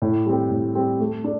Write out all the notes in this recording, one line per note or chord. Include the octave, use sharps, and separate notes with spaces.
A2
G3 C4
A2
G3 C4
A3
D4